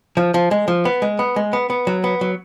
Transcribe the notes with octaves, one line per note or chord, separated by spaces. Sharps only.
F3
F3
G#3
F3
B3
G#3
B3
G#3
B3
B3
F#3
B3
F#3